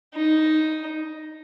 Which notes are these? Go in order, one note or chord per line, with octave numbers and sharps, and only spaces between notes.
D#4